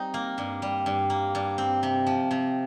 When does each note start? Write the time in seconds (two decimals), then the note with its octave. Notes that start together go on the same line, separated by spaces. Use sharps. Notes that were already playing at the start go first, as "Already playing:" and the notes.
Already playing: G3 C4 D#4
0.14 A#3
0.38 G2
0.62 G3
0.86 G2
1.10 A#3
1.35 G2
1.58 C4
1.83 C3
2.07 F3
2.31 C3